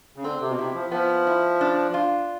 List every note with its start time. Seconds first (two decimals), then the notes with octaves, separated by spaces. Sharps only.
0.16 C#3
0.24 D3 C4
0.41 C3
0.50 B2
0.58 C3 E4
0.74 F3
0.91 F3 B3
1.27 E4
1.61 D4
1.94 F4